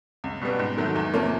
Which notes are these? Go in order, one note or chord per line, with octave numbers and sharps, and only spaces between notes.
C#2
B2 G3 B3
G#2
D#3 F#3 A3
E2
C3 F3 A#3 C#4